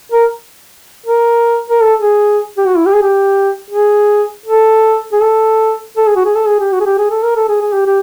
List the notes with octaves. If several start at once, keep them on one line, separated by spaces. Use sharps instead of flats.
A#4
A#4
A#4
A4
G#4
G4
F#4
E4
G4
G#4
G4
G#4
A4
G#4
A4
A4
G#4
F#4
G#4
A4
G#4
G4
F#4
G#4
G4
G#4
A4
A#4
A4
G#4
G#4
G4
G4